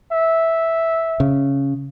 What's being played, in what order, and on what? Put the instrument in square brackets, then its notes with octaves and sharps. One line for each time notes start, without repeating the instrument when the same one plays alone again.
[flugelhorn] E5
[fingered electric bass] C#3